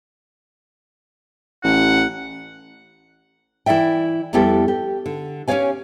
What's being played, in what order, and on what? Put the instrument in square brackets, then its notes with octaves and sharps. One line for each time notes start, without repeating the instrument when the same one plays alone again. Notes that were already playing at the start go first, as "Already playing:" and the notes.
[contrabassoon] A1 [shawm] F#5
[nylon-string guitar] E3 E4 F#4 D5 E5 G5
F2 G3 B3 E4 G4 A4
G4
D3
C#4 G4 G#4 C#5 F5 G#5